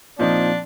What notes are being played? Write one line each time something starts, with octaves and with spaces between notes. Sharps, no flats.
A#2 F3 C4 D4 D#4